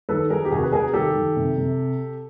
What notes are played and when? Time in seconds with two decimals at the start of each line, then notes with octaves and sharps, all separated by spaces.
0.09 D#3 A4 B4
0.30 D#3 G#4 A#4
0.45 G4
0.51 C3 F#4 G#4
0.63 B4
0.72 C3 G#4 A#4
0.93 D#3 G4 A4
1.15 D#3
1.36 C3
1.57 C3